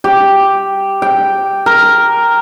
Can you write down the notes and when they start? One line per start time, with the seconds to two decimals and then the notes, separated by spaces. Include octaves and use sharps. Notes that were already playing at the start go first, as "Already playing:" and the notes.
0.04 G4
1.02 G5
1.66 A#4